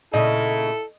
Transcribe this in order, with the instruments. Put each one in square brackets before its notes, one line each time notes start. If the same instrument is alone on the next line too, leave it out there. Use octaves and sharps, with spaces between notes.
[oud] A#2 C#3 D#4 [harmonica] E4 A4 [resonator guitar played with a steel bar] D#5